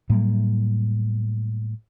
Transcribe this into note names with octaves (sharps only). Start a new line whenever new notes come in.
A2 F#3 G3 A#3